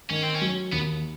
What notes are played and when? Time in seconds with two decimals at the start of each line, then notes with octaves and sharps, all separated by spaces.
0.10 D#3 C#4
0.23 C4
0.36 C#4
0.41 F#3
0.72 D#2 B3